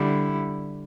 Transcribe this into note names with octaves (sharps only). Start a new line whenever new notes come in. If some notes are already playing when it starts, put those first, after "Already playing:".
Already playing: D3 G3 E4